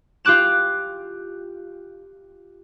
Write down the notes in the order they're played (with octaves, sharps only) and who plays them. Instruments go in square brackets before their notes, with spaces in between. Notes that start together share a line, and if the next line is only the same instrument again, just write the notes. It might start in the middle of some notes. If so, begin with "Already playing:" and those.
[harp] F4 G4 D6 F#6 E7